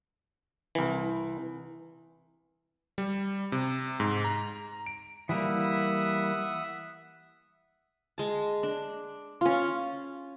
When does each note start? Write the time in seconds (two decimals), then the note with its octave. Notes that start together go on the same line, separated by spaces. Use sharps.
0.75 C2 E3
2.98 G3
3.52 C3
4.00 G#2
4.24 A#5
4.86 D7
5.29 E3 G3 A#3 E5 F#5 D#6
8.18 G#3 A5
8.63 D4
9.41 C#4 F4